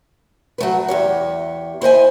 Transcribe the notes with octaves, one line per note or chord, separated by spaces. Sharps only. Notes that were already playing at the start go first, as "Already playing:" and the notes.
F#3 A3 B4
E2 G4 C#5
E4 C5 D#5 G#5